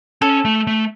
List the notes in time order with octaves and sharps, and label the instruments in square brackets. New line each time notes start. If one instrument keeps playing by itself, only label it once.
[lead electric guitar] C#4 [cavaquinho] A4
[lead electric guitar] A3
A3